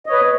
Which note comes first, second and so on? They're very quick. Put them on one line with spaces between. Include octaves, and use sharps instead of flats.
D#5 C#5 B4